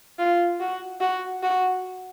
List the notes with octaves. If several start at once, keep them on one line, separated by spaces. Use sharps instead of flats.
F4
F#4
F#4
F#4